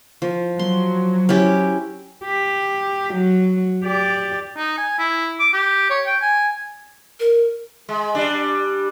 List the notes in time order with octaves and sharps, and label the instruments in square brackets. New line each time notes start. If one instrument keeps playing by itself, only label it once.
[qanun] F3
[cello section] F#3 [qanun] C6
[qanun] C#4 E4 G4
[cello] G4
F#3
G4 D5
[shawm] D#4
G#5
E4
D6
G4
C#5
G5
G#5
[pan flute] A#4
[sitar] G#3
G3 D4